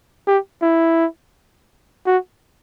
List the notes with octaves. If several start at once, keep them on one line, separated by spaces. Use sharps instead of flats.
G4
E4
F#4